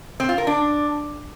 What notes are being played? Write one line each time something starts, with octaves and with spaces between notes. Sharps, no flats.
C4
F4
A#4
D4